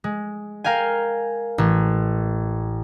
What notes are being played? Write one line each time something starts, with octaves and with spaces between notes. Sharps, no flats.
G#3
A#4 F5 G5 G#5
A1